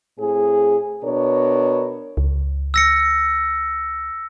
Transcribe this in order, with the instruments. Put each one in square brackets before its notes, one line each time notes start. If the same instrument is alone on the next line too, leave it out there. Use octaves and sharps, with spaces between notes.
[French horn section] A2 C4 G#4
B2 D4 A#4 C#5
[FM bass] C#2
[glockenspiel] E6 A#6 C#7